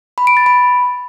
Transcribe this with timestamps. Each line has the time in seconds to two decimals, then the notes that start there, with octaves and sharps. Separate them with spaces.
0.18 B5
0.27 D7
0.37 A6
0.46 B5